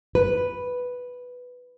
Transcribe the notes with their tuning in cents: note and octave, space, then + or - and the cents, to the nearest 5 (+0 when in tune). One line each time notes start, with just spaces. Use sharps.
B4 +0